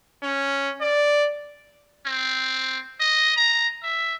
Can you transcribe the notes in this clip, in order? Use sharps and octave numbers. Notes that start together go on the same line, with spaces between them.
C#4
D5
C4
D#5
A#5
E5